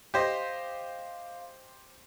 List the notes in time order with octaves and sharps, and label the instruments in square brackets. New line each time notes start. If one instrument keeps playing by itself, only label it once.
[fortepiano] G4 C5 D#5 [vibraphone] F5